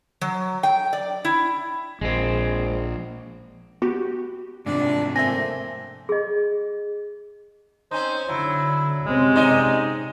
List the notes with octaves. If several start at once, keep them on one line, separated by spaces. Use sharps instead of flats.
F#3
G5
D5
E4
A#1 G#3 C4
B3 F#4 G4
G#2 C3 F3 D4
A3 A#3 C4 E5 G#5 A#6
G#4 D#5
C4 C#4 D#4 C5
D3 F#3 E4
C3 G#3 C4 C#4
G#2 D#4 D5